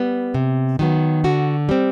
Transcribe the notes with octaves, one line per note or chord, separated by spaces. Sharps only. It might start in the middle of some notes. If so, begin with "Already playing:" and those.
Already playing: G3 B3
C3
D#3 F#3 B3
D3 F#4
G3 C4